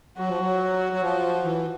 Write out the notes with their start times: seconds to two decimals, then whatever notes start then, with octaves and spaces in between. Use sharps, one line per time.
0.18 F#3 F#4
0.29 F3
0.41 F#3
0.93 F#3
1.02 F3
1.44 E3